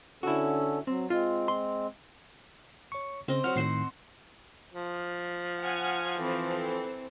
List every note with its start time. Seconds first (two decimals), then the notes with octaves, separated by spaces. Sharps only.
0.23 D3 C#4 E4 F#4 A4
0.87 F#3 C4
1.10 G#3 C4 F4
1.48 C6
2.92 C#5 C#6
3.28 C#3 C4 D#5
3.44 F#3 F#5 F6
3.56 A2 D#3 C4 C5 F#5 C7
4.72 F3
5.61 F#5 G#5 F6
6.19 E3 C4 A4